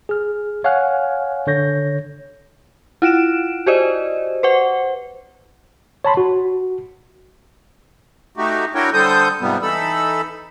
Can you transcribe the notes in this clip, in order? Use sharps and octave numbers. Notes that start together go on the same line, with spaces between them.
G#4 F6
C#5 F5 F#5 G#5 F6 F#6
D3 C#5 G6 A#6
E4 F4 D7 E7
F#4 G4 C5 D5 D#5
B4 C5 F#5
C#5 A5 B5 C6
F#4
A3 D#4 F#4 G4
D4 E4 F#4 A#4 C#5 G5
D3 G3 A4 C5 D#6 G6
G#2 C3 F3 G3 B3
E3 D#4 A4 B5 E6